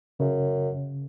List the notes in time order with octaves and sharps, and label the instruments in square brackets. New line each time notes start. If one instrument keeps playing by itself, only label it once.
[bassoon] F#2 [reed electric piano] C#3